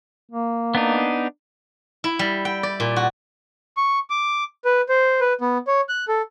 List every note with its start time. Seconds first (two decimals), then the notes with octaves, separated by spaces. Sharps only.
0.31 A#3
0.75 B3 D4 D#4
2.04 E4
2.19 G3
2.45 G5
2.63 D5
2.80 A#2
2.96 F#4
3.77 C#6
4.10 D6
4.65 B4
4.89 C5
5.21 B4
5.41 B3
5.67 C#5
5.89 F#6
6.08 A4